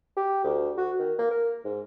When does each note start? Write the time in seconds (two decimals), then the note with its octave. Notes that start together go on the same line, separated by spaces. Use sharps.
0.17 G4
0.44 D2
0.78 F#4
0.99 D#3
1.19 A#3
1.31 A#4
1.65 G#2